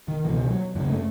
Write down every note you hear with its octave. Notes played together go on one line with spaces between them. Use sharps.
D#3
C#2 B2 E3
F#3
F#2 C#3 E3
A3